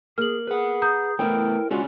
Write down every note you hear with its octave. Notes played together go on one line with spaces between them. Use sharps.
A#3 G#4 F6 F#7
G#4 B4 F#5
A#5 D#6 G6
E3 A3 B3 E4 A#4 C5 G5
G#3 C#4 D4 F4 F#4 G#4